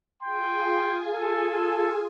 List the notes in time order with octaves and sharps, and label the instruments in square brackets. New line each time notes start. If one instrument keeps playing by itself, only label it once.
[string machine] F4 G#4 G#5 [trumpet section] G5 C6
[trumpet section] A4